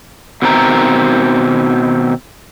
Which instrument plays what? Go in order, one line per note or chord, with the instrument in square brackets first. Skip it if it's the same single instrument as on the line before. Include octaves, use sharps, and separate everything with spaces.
[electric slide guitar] B2 D#3 C4 B4 A#5